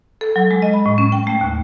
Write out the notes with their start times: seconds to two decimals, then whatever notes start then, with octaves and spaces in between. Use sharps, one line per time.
0.21 A4
0.36 F#3
0.51 G#3
0.62 D#5
0.74 B5
0.86 A2
0.98 C#4
1.12 G5
1.27 A3
1.41 D#2